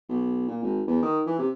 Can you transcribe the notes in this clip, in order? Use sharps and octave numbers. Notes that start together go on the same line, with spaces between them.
B1
A#2
G#1
E2
D#3
E3
C3